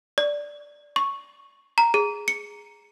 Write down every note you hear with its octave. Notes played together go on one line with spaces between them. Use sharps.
D5
C#6
A#5
G#4
C#7